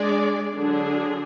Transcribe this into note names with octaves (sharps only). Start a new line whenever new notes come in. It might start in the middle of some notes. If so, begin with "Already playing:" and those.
Already playing: G#3 D4 G#4 D5
D3 F#3 D4 G#4